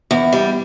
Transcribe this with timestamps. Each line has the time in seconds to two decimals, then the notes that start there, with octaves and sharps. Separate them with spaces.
0.11 E2
0.33 G3